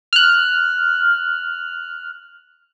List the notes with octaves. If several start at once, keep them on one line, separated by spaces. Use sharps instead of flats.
F6 F#6